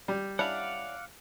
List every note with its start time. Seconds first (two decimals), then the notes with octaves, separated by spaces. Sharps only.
0.08 G3
0.39 C#4 D4 E4 D5 F5 F#5